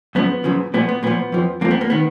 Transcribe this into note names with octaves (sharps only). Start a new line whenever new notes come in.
F#2 C#3 F3 B3
F#2 C#3 F3
A#2 F3 B3
B3
A#2 F3 B3
F2 F3
F2 F3 A#3
B3
A#3
D#3 B3